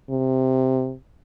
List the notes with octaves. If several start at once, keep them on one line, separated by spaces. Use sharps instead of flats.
C3